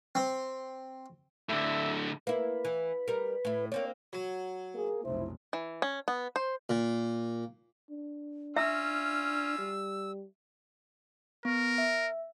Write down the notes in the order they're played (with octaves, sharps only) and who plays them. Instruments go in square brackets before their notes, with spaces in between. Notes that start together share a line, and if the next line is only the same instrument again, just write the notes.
[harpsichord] C4
[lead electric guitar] A2 D3 [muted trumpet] E5
[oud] A#3 E4 [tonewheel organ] B4
[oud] E3
G3 A#4
A2 E4
[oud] A#3 C4 D4 [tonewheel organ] C#5
[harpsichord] F#3
[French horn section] A#3 G#4
[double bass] F1 B1 [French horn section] E4 C5
[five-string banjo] E3
C#4
B3
C5
[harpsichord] A#2
[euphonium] D4
[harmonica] C#4 F4 [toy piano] E5 [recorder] E6
[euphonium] G3
[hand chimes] B3 [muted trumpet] A#4
[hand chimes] E5